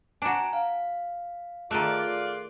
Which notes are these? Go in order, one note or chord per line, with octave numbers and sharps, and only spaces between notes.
D4 F#4 G#5 A#5
F5
D#3 A3 F4 G#4 D5 F#6 D7